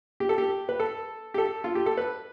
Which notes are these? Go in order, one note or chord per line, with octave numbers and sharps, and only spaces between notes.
G4
A4
G4
B4
A4
G4
A4
F4
G4
A4
B4